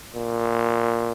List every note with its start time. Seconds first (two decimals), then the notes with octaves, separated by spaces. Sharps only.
0.15 A#2